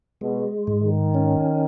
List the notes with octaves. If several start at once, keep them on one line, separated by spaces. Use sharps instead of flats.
B2 G#3
G#2
D#3
C#4